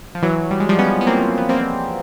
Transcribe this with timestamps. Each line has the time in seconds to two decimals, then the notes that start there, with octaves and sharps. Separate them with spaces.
0.15 F3
0.22 E3 F#3
0.51 G3
0.60 G#3
0.69 F3 G3
0.79 B3 C#4
1.01 B3
1.07 A#3 C4
1.38 B3
1.49 A#3 C4